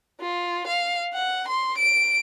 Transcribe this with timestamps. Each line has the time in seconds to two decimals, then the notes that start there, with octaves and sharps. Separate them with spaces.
0.20 F4
0.67 F5
1.14 F#5
1.48 C6
1.78 D7